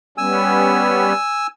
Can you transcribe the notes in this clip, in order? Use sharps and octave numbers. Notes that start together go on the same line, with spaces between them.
G3 B3 C#4 G#5 E6